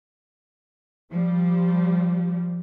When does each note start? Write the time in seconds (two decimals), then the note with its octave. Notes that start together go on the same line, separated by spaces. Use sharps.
1.10 F3 G3